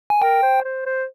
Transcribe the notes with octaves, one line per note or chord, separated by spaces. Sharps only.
G#5
A#4 G5
C5
C5
C5